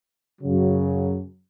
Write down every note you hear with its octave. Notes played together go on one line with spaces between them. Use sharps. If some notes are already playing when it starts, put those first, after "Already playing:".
F#2 C#3 F#3